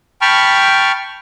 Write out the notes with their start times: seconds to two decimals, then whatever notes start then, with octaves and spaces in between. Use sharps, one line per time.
0.22 G5 A5 B5 C#6 F6